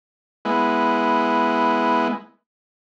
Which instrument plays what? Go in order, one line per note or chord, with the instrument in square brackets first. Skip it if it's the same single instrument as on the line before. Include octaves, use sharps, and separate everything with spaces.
[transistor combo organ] G#3 B3 E4